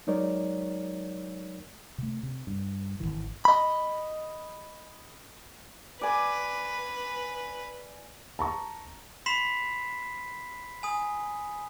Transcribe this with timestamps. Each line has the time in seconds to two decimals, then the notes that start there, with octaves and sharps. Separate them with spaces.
0.07 F#3 G#3 D#4 A#4 C#5 D5
1.98 C3 A3
2.23 C3
2.47 G2
3.00 G#1 D#2 D#3 E3
3.45 D#5 B5
6.01 B4 D5 G#5
8.39 A5 A#5 C#6
9.26 B5 C6 B6 C7 E7
10.83 G#5 D#6